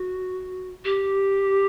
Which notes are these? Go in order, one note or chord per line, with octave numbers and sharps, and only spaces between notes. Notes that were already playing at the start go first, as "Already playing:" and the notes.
Already playing: F#4
G4